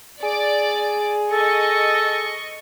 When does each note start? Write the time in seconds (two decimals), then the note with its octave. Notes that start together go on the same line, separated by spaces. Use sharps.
0.23 G#4 D5 D6
1.31 A4 D#5 C#6